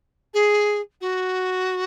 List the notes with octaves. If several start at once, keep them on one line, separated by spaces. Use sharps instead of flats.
G#4
F#4